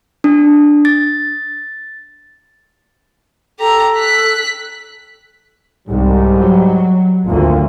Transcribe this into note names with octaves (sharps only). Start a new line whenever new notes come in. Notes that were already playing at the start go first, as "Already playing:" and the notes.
D4
A6
G4 A4 A#5
F#6 B6
C2 G#2 G3
F#3
G#1 D2 A#3 F4